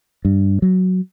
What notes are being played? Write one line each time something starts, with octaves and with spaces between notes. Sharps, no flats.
G2
F#3